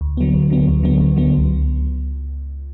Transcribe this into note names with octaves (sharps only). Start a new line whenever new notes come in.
D2
D3 F#3 B3
D2
D3 F#3 B3
D2
D3 F#3 B3
D2
D3 F#3 B3
C#2